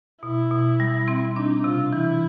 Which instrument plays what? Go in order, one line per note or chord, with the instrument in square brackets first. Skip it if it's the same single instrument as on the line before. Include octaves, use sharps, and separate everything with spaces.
[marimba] B2 [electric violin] E4
[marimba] B2
G3
C4
[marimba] D4 [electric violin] D#4
[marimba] C3 [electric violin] F4
[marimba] E3 [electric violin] E4